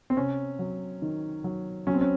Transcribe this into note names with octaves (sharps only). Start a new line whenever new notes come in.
C4
C3 C#4
F#3
D#3
F#3
F#3 C#4
C4
C#4